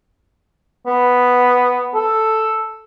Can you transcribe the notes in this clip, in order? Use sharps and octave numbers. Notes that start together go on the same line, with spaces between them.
B3
A4